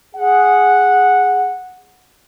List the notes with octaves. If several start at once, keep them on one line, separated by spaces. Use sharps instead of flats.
G#4 F#5